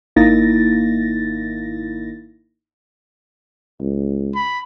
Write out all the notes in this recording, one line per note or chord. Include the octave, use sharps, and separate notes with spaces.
G#1 A#3 D#4 E4 A6 A#6
C#2
B5